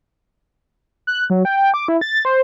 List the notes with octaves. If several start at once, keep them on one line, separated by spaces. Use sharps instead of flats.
F#6
F#3
G5
G5
D6
E4
A6
C5